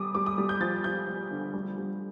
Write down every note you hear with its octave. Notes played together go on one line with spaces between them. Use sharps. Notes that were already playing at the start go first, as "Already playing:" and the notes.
Already playing: G3 D6 D#6
G3 D6
D#6
G3
G6
F3 A6
F3 G6
F3
D3
G3
G3